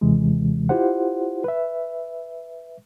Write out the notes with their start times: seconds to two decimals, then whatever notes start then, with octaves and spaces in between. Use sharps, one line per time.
0.01 D#2 C3 E3 G#3
0.69 E4 F4 G4 C5 F#5
1.44 B4 E5